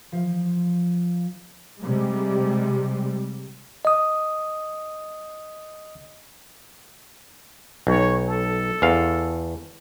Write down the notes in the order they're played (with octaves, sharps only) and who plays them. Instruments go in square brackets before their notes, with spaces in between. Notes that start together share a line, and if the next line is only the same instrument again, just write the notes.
[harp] F3
[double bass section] C3 G3 G#3
[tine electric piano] D#5 D#6
[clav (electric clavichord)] B1 [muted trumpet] C#5
[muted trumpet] A4
[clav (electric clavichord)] E2 F5